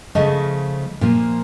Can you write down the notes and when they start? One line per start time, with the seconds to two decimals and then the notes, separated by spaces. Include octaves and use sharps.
0.15 C#3 F3 A3 D#5
1.01 A#2 F3 A#3